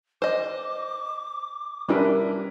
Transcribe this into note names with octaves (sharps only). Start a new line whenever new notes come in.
C5 D#5 D6
G3 C#4 D4 E4 A#4 B4